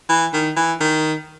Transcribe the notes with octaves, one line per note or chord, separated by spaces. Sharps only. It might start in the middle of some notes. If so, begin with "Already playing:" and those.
E3
D#3
E3
D#3